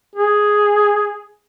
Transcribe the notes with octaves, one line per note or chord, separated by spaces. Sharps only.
G#4